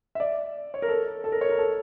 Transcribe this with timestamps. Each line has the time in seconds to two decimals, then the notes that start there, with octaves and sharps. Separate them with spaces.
0.15 E5
0.20 D5
0.74 C#5
0.82 A#4
0.88 A4
1.24 A4
1.32 A#4
1.41 C#5
1.49 A#4
1.58 A4